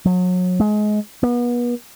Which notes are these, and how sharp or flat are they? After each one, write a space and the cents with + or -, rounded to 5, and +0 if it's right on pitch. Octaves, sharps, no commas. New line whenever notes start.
F#3 -30
G#3 +25
B3 -35